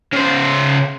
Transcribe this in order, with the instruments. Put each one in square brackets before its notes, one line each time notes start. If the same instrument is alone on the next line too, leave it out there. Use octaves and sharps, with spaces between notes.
[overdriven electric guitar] C#3 C5